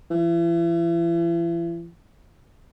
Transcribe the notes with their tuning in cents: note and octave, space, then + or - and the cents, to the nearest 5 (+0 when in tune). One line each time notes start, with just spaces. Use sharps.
E3 +40